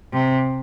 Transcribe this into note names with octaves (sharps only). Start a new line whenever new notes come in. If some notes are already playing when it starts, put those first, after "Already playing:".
C3